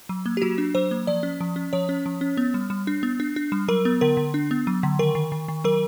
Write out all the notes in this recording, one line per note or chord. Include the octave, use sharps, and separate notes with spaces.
F#3
A#3
G4
F#3 F#4
D4
F#3 C5
A#3
F3 D5
C#4
F3
C#4
F3 C#5
C#4
F3
C#4
B3
G3
G3
D4
B3
D4
D4
G3
F#3 A#4
B3
D3 A#4
D3
D4
B3
F#3
D3
D#3 A#4
D#3
D#3
D#3
F#3 A#4